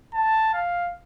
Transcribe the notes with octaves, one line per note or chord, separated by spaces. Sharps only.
A5
F5